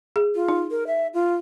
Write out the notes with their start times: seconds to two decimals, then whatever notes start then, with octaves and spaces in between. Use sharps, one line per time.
0.16 G#4
0.35 F4
0.48 D#4
0.71 A#4
0.87 E5
1.14 F4